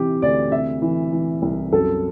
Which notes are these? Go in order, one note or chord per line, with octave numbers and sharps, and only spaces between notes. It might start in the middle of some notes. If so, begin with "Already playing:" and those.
Already playing: C3 E3 G4
D2 D5
C3 E5
E3
E3
C2
F#2 A4